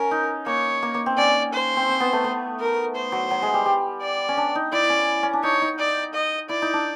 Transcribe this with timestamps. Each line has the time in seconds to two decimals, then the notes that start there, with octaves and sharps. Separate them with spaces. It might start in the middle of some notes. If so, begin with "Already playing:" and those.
Already playing: C#4 A#4
0.11 D#4
0.46 A#3 C#5
0.82 A#3
0.94 A#3
1.06 C4
1.17 C#4 D5
1.53 C5
1.77 C4
1.89 C4
2.00 B3
2.13 A3
2.24 A3
2.60 A#4
2.95 C5
3.12 F#3
3.31 F#3
3.42 G#3
3.54 G3
3.66 G3
4.01 D5
4.29 C#4
4.37 D4
4.55 D#4
4.72 E4 D5
4.90 C#4
5.23 C#4
5.33 D4
5.43 D#4 C#5
5.62 D#4
5.79 D5
6.14 D#5
6.49 E4 D5
6.62 D#4
6.73 D4